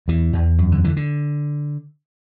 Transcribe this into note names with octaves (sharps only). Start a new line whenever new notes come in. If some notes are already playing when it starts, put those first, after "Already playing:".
E2 E3
E2
F#2
D3
D3 E3
D3